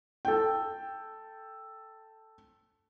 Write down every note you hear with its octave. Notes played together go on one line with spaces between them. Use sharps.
A4 G5